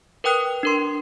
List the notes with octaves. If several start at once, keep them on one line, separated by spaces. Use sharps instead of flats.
A#4 B4 G5 D#6 F#6
D4 A#4 C6